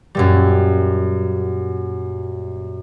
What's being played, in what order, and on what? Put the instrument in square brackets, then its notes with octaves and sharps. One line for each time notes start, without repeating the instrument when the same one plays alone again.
[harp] F#2 A#2 G3